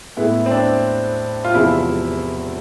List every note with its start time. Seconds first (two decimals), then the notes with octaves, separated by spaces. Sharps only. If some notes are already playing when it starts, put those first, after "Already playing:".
0.17 A2 G#3 B3 E4
0.46 C4
0.51 D4
1.44 F4
1.54 E1 E2 C3 F3 G#3 E4